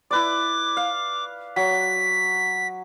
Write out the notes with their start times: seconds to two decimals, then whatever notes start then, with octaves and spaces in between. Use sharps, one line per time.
0.11 E4 B4 D5 D6
0.77 F5
1.56 F#3 B6